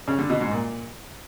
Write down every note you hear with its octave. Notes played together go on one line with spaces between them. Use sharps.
C#3
D3
B2
G#2
A#2